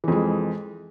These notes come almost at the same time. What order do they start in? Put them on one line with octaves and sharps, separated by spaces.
E3 F2 G#3